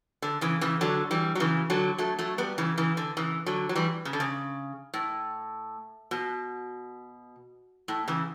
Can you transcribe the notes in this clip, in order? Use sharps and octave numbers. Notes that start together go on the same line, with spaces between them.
D3
C#3 E3
C#3 E3
D3 F#3
E3 G3
F#3
C#3 E3
D3 F#3
F#3 A3
F#3 A3
G3 B3
C#3 E3
C#3 E3
D3
C#3 E3
D3 F#3
F#3
E3 G3
C#3
D3
C#3
A2
B2
A2
C#3 E3